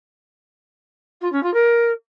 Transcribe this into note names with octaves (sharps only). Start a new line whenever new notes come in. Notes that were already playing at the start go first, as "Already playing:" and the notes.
F4
C#4
F4
A#4